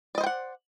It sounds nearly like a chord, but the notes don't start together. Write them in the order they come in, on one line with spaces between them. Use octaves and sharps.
D5 D#5 C5 G5 F#5